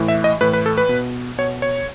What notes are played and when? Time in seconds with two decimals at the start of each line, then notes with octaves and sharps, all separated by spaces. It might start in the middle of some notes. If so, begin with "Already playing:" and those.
Already playing: A2 E3
0.08 E5
0.24 D#5
0.41 A2 E3 B4
0.53 B4
0.66 A4
0.77 B4
0.89 B2
1.38 B2 C#5
1.62 C#5